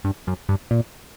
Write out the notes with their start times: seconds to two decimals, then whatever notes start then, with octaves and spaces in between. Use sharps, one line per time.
0.05 G2
0.27 F#2
0.49 G2
0.71 A#2